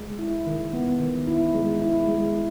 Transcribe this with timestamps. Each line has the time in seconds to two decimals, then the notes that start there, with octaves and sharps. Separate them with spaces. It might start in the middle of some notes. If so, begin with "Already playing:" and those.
Already playing: G#3
0.19 E4
0.47 D#3
0.73 B3
1.00 D#3
1.27 E4
1.54 G#3
1.82 E4
2.08 G#3
2.35 E4